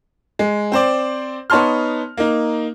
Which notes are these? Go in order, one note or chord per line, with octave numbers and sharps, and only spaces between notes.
G#3
C4 C5 D5
B3 D#4 C#5 A5 C6 F6
A#3 D#4